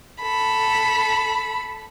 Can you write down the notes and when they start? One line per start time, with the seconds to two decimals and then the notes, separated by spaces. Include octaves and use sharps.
0.22 A4 B5